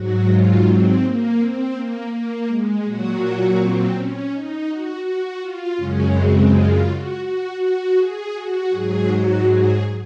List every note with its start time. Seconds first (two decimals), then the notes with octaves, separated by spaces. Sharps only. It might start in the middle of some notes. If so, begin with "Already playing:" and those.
Already playing: G#2 F#3 F#4
0.26 F4
0.64 C4
1.01 A#3
1.37 C4
1.73 A#3
2.11 A#3
2.47 G#3
2.83 A#2 F#3 F#4
3.57 C4
3.93 C#4
4.30 D#4
4.67 F#4
5.03 F#4
5.39 F4
5.76 F#2 C#3 G#3 C#4
6.13 C4
6.49 F4
6.86 F#4
7.23 F#4
7.59 F#4
7.96 G#4
8.33 F#4
8.70 G#2 F#3 G#4
9.06 F#4
9.42 G#4